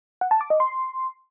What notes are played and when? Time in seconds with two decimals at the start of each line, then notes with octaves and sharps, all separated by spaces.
0.21 F#5
0.31 A5
0.41 D6
0.50 D#5
0.60 C6